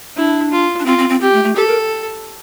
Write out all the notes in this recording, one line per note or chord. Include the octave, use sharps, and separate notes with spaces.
D4 E4
F4
D4
C4 F4
C4
C4
C4 G4
A3
A3
G4 A4
A#4